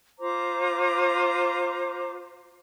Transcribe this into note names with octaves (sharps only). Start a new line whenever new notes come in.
F4 C5 A#5 D6